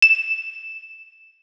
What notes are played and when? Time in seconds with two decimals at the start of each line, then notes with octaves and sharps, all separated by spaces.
0.02 E7